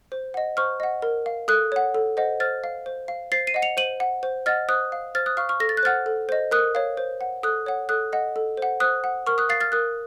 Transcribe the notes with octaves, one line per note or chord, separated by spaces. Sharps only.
C5
D#5 F#5
C5 C#6 F6
D#5 F#5
A#4
F5
A4 D#6 F#6
C#5 F#5
A4
C5 D#5 F#5
C5 F6 A6
F5
C5
F5
C5 A6 C7
C7 D#7
D#5 F#5
C#7 F7
C5 D#7 F#7
F#5
C5
D#5 F#5 F6 A6
C5 D#6 F#6
F5
C5 F6 A6
D#6 F#6
F5 C#6 F6
C#6 F6
A4 A#6
A6
F#6
C5 F#5 F6 A6
A4
C5 D#5
A#4 D#6 F#6
C#5 F5
C5
F#5
A4 D#6 F#6
C#5 F#5
A4 D#6 F#6
D#5 F#5
A4
C5 F#5
C5 D#6 F#6
F#5
A#4 C#6 F6
D#6 F#6
F5 A6 C7
F6 A6
A#4 D#6 F#6